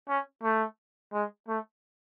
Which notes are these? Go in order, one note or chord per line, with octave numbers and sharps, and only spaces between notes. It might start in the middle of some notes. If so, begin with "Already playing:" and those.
C#4
A3
G#3
A3